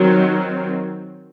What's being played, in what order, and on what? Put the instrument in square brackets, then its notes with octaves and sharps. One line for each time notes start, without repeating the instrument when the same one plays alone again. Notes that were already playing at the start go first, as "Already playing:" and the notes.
Already playing: [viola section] D#3 F#3 C4